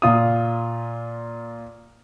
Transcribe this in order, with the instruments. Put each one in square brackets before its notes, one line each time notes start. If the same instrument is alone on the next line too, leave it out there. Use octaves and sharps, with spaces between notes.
[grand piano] A#2 F4 D#6